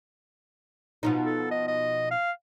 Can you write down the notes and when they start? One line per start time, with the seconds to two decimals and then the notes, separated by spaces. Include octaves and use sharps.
1.03 B2 F3 D#4
1.26 A4
1.51 D#5
1.68 D#5
2.11 F5